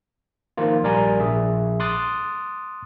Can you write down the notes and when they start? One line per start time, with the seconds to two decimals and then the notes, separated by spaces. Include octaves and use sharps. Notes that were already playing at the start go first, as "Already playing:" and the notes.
0.57 D#3 F3 A#3 F4
0.83 A#1 G3 A#4 D5 G#5 A#5
1.20 A#1 G#4 E5
1.80 C6 D6 D#6 F#6 A6